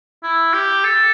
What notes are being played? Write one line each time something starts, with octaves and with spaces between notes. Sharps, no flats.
E4
G4
A4